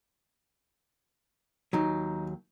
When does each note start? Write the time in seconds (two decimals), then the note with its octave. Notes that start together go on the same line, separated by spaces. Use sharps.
1.73 D#2 F#3 D#4